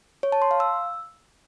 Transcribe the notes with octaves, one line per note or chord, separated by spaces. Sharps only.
C#5
A5
C6
F5
E6